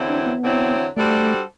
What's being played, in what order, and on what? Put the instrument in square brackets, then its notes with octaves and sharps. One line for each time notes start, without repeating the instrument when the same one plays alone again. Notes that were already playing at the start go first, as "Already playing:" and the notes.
Already playing: [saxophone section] E2 D3 F#3 C4 E4
[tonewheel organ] D4
B3
[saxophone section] E2 D3 F#3 C4 E4
[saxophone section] G3 D4 F#4 A4 C5 [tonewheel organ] A3